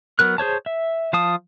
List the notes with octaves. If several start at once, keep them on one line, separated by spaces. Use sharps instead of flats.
F#3 B3 A#4 F#6
G#4 C5 C#5 A5
E5
F3 F5 A5 D#6